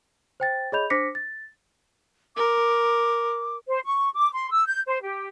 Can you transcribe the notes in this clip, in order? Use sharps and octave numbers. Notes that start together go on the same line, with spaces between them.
C5 G5 A6
G#4 C#5 D#5 B5 G6 F7
D4 C5 D6 A#6 B6 C#7
A6
A#4 D6
C5
C#6
D6
C6
E6
G6
C5
G4